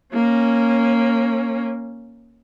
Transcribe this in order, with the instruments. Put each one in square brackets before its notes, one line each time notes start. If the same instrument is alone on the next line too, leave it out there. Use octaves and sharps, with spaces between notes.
[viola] A#3 C#4